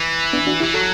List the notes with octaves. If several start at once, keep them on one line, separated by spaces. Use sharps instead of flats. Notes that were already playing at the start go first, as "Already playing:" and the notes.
Already playing: E3
B3 D4
D4 F#4
E3 E4 G4
F#3 F#4 A4